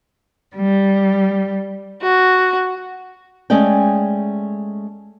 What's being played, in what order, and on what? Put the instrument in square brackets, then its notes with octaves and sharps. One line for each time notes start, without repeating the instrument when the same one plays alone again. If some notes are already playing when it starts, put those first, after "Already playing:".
[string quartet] G3
F#4
[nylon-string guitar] G#3 A3 C#4 G#4 D5 G5